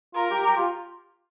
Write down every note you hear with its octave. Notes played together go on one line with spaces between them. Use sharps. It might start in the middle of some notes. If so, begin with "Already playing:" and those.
F4 A#4
G4
G4
F4